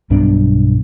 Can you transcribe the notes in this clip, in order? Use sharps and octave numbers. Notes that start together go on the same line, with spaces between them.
B1 G2 B2 D4